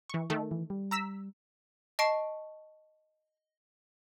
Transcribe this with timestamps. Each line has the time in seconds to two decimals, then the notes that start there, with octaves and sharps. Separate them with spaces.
0.09 E3 C#6
0.30 D#3 A3
0.51 E3
0.70 G3
0.91 A#5 E6 B6
1.99 D#5 A5 C#6 C7 D7